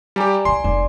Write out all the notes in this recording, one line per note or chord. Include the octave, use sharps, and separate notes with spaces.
G3 G4 D5 G#5 A#5
C2 C3 G#5 C6
F1 D5